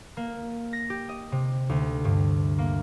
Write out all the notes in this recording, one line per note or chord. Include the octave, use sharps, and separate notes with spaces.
A#3
A#6
G4
D#5
C3
D2
G2
A#3